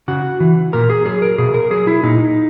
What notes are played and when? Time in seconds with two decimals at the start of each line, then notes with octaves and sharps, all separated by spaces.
0.08 C#3 F#4
0.40 E3
0.73 A#2 A#4
0.90 G#4
1.06 F#3 G#4
1.22 A#4
1.38 B2 G#4
1.54 A#4
1.71 F#3 G#4
1.87 E4
2.03 A#2 D#4